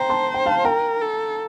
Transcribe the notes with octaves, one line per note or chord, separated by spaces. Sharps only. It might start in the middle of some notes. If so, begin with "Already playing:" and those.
Already playing: C5 G5 A#5
A5 C6
G5
F5 A5
A#4 G5 A#5
A4